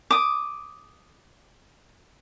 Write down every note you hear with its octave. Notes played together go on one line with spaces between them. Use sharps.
D6 D#6